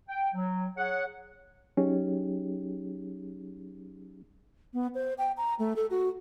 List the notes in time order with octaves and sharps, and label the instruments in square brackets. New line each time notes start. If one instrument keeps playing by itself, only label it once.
[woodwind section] G5
F#3
G#4 C#5 F#5
[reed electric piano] F#3 C#4 D#4 G4 G#4
[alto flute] B3
C5
G5
A#5
A3
A4
F#4